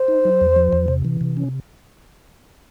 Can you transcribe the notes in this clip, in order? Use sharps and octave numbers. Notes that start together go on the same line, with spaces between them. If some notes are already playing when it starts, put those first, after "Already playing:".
Already playing: C5
D#4
F#3
E2
F3
E2
C3
E3
C3
C#4